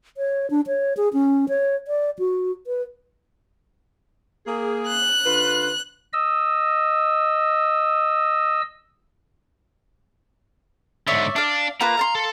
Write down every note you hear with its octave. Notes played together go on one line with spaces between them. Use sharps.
C#5
D4
C#5
G#4
C#4
C#5
D5
F#4
B4
A#3 G#4
F#6
D3 F4 B4
D#5 E6
G#2 D3 C#5 D5 E5
D4 D5 F5
A#3 F4 B4 A#5
F5 A5 C6
A4